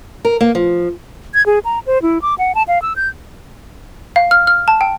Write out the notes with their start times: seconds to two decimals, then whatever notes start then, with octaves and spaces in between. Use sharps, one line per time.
0.25 A#4
0.41 A#3
0.55 F3
1.34 G#6
1.46 G#4
1.65 A#5
1.87 C5
2.02 E4
2.22 D6
2.39 F#5
2.55 A5
2.68 F5
2.82 E6
2.96 G6
4.16 F5
4.31 F6
4.47 F6
4.68 A5
4.81 G5